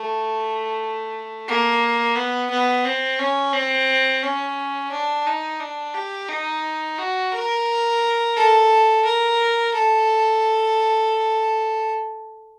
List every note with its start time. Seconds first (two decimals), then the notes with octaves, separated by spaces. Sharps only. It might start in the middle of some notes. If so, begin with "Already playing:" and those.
Already playing: A3
1.48 A#3
2.16 B3
2.51 B3
2.85 C4
3.19 C#4
3.54 C4
4.23 C#4
4.92 D4
5.27 D#4
5.60 D4
5.95 G4
6.29 D#4
6.99 F#4
7.33 A#4
8.36 A4
9.05 A#4
9.74 A4